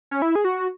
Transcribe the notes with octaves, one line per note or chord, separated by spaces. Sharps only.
C#4
E4
G#4
F#4